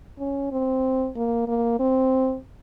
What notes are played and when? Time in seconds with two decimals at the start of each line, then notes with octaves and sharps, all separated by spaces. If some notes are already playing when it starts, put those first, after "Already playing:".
0.19 C#4
0.52 C4
1.16 A#3
1.48 A#3
1.80 C4